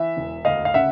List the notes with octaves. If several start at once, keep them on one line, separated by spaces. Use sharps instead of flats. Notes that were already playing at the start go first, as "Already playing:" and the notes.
Already playing: E3 E5
E1
D2 D#5 F5
F5
C#3 E5 F#5